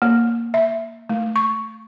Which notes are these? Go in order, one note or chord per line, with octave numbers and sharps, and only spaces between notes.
A#3
E5
A3
C#6